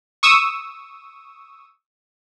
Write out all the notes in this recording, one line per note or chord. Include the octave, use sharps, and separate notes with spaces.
C#6 D#6 E6